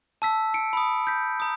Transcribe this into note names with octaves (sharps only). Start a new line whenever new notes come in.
A5 E6 B6
C#7 D7
B5 D#6
G6 B6
A#5 D#6